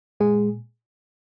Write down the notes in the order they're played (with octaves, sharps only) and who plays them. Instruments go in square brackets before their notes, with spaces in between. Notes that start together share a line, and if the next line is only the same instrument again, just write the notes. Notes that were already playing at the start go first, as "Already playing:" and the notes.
[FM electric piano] A#2 G#3 G#4